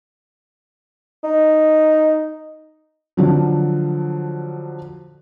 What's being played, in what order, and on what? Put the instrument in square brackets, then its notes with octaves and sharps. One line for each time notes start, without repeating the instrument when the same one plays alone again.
[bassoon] D#4
[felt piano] D3 F3 F#3